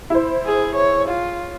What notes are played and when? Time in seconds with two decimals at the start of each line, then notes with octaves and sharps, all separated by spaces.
0.10 E4 C5
0.46 G#4
0.75 C#5
1.08 F4